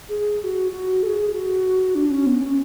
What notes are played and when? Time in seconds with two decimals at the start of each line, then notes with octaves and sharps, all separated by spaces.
0.09 G#4
0.41 G#4
0.44 F#4
0.71 F#4
1.03 A4
1.07 G#4
1.34 F#4
1.95 D4
2.10 C#4
2.26 B3
2.41 C#4